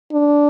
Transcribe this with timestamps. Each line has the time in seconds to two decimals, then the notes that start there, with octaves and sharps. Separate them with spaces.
0.12 D4